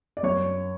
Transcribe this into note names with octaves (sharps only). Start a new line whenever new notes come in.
D5
F#2 C#5